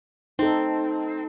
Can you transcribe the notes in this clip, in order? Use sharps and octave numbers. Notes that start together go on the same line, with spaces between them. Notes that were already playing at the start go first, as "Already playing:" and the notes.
C4 D#4 A4